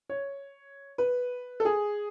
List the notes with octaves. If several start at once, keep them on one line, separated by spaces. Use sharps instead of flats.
C#5
B4
A4
G#4